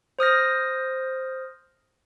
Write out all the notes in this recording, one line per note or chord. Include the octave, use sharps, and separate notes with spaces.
C5 D#6 F6 A#6